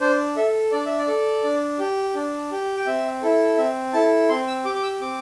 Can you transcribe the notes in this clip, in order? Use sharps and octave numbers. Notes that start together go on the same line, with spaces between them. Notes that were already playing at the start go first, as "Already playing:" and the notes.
D4 C5
A4 E5
D4 D5
E5
D5
A4
D4
G4
D4
G4
G5
C4 E5
E4 A4
C4 E5
E4 A4 A5
C4 C6
E6
G4 D6
D6
E6
C4 D6